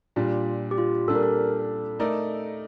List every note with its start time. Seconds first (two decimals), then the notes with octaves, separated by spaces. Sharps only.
0.16 A#2 G3 D4 F4
0.71 G4
0.78 F4
1.08 A#2 G3 D4 A4
1.15 A#4
1.23 A4
1.99 A3 D#4 A#4 D5